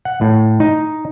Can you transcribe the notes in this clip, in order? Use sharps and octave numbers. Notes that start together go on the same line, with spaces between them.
F#5
A2
D#4